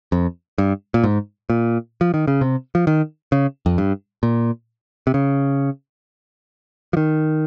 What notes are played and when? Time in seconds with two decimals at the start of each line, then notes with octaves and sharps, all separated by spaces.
0.12 F2
0.58 G2
0.94 A#2
1.04 G#2
1.50 A#2
2.01 F3
2.14 D#3
2.28 C#3
2.41 C3
2.75 F3
2.87 D#3
3.32 C#3
3.66 F2
3.78 G2
4.23 A#2
5.07 C3
5.14 C#3
6.93 F3
6.97 D#3